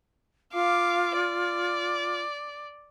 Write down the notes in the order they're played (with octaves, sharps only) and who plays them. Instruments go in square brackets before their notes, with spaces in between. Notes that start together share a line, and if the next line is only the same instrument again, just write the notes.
[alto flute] F4 [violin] F5 D6
[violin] D5